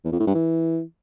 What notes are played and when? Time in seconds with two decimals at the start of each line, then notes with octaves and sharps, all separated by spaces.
0.04 E2
0.12 F2
0.20 A2
0.27 G2
0.35 E3